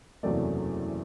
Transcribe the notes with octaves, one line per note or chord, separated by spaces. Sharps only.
F#1 E2 C3 F#3 A3 D5